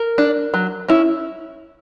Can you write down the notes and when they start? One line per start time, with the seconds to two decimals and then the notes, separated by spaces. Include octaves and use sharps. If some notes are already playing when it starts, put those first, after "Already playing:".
Already playing: A#4
0.18 D4
0.54 F#3
0.88 C#4 E4